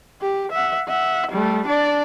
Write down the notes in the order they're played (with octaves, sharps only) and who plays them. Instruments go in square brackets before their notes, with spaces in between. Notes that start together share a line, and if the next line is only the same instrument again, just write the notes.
[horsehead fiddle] G4
E5 F#5
E5 F#5
G3 A3
D4 D5